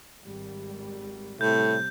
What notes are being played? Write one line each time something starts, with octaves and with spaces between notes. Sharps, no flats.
G#1 G3
A2 C3 G3 C4 G6